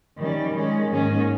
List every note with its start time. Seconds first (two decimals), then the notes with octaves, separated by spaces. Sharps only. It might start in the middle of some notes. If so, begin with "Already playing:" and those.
0.17 D#3 G3 C#4
0.53 D#3 G#3 C#4
0.89 G#2 D#3 A#3 C#4